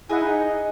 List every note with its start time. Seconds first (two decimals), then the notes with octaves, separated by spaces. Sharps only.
0.09 E4 G#4 D#5 F#5
0.21 D#4